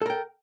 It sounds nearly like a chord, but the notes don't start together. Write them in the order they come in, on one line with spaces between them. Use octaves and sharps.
A4 A#4 G5